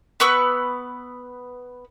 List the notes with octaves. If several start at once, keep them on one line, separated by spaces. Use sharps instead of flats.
B3 B4 C#6 E6